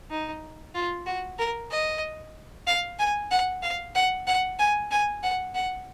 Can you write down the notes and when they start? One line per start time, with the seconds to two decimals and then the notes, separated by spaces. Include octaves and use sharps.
0.10 D#4
0.74 F4
1.06 F#4
1.38 A#4
1.71 D#5
2.67 F5
2.99 G#5
3.31 F#5
3.62 F5
3.95 F#5
4.27 F#5
4.59 G#5
4.91 G#5
5.23 F#5
5.55 F#5